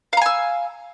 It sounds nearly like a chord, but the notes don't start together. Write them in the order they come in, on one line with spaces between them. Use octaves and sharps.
F5 A#5 G#5 E6